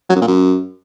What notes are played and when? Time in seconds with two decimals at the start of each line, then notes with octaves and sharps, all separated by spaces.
0.10 F#3
0.16 F#2
0.21 A#2
0.27 F#2